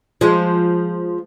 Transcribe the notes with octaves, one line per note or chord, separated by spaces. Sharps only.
F3 G#3